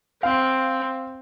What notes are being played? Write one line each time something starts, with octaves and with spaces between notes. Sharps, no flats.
C4 F5